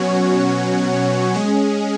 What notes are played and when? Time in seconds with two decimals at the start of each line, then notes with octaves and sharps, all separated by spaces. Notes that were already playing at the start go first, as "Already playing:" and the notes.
Already playing: B2 F#3 C#4 F#4 C#5
1.35 G#3 C#4 G#4